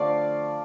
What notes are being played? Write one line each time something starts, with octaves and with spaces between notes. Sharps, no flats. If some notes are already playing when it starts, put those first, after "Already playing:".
Already playing: D3 F3 A3 D5 F5